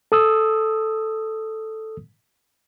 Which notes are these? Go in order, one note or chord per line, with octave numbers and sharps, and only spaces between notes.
A4 D#6 E6